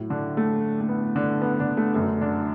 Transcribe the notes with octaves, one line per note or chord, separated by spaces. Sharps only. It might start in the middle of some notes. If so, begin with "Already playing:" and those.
Already playing: A2 F#3
D3 D4
A3
A3
B3
D3 D4
B3
D3 D4
A3
F#2 D3 F#3 A3
D3 D4